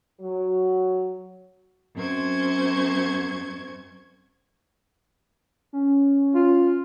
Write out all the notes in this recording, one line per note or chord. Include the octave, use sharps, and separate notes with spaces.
F#3
F#2 C4 C#4 C5 C#6 G#6
C#4
F4